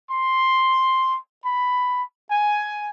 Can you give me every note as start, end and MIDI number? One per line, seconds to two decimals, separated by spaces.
0.11 1.17 84
1.44 2.03 83
2.30 2.90 80